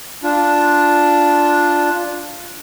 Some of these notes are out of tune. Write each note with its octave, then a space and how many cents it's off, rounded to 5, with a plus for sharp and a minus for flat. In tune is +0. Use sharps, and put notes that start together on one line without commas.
D4 +0 F4 +0